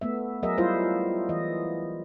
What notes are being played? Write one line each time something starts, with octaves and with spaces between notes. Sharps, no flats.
A3 B3 E5
F#3 G#4 A#4 D#5 E5
F#3 G3 E4 F4 C5
E3 D#5